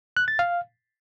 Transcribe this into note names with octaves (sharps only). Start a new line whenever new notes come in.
F#6
A6
F5